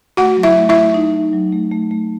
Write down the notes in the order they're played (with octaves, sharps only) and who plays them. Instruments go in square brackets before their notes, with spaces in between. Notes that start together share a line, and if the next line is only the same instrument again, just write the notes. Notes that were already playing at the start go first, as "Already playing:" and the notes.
[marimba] A3 [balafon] F#4 F#5
[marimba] F#3
[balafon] E4 E5
[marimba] A3
[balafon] E4 E5
[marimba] A3
D#4
D#4
F#3
A3
A3
A3